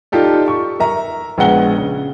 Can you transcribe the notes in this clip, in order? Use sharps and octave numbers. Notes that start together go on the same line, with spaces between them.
D#4 F4 G4 A4 D5
C#6
A#4 E5 A#5
A#1 G#3 B3 F#5 G7
C#3